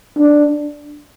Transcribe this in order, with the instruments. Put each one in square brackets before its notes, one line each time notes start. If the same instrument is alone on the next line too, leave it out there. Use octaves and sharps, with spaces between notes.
[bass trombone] D4